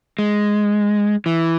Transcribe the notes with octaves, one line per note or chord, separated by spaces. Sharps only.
G#3
E3